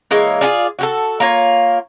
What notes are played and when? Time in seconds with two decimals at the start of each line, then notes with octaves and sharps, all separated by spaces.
0.11 E3 G#3 A#3 C#5
0.41 F4 G#4 D5
0.79 F#4 G4 A4
1.20 A#3 F4 C#5